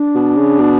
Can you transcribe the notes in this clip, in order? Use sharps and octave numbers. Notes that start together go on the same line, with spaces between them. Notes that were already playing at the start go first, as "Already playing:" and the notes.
Already playing: D4
B2
C#3
B2